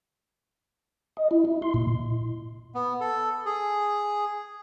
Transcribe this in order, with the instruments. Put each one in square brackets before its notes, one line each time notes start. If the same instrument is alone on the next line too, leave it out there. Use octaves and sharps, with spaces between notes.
[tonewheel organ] D#5
E4
E4
C6
A#2
[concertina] B3
A4
G#4